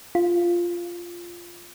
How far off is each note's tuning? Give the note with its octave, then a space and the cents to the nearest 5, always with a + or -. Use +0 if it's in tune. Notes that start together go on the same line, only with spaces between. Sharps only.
F4 -5